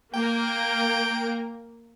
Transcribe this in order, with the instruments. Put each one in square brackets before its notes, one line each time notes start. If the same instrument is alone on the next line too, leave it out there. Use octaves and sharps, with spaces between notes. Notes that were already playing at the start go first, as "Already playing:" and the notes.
[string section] A#3 A#4 [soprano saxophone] G5